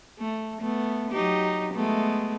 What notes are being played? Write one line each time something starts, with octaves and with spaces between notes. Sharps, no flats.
A3
A3 B3
F#3 D#4 G4
G#3 A3 B3